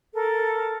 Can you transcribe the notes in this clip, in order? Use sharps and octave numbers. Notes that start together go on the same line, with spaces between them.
A4 A#4